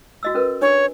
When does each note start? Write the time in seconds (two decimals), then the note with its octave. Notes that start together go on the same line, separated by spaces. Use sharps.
0.23 F#4 D#5 E6
0.35 C#4 A#4 B4
0.62 D4 C#5